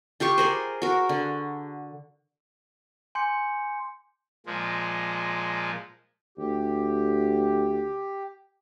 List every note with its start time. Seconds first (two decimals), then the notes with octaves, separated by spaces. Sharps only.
0.20 F4 G4 F5 C#6
0.38 G#4 A#4 C5
0.82 F#4 A#4
1.09 D3
3.15 G#5 C6 D6 G6 C#7
4.46 A#2 F3 G#3
6.38 D2 G4